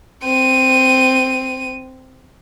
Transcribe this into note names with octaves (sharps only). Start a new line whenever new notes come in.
C4 D#7